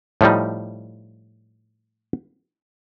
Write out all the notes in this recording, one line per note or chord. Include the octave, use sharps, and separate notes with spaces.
A2 F3 G3 D#4